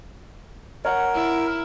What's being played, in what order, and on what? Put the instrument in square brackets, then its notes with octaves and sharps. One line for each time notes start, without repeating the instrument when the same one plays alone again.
[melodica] A#4 [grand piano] C#5 F#5
[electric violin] E4